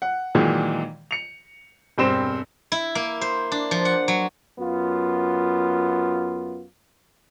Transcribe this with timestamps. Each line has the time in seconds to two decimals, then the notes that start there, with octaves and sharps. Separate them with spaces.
0.02 F#5
0.35 A#2 D#3 E3 F#3 G#3
1.11 C#7 F7
1.98 E1 G2 C4 C5 E7
2.72 E4
2.95 A#3
3.21 C5
3.52 D4
3.71 F3
3.85 F#5
4.08 F#3
4.59 F#2 B3 F4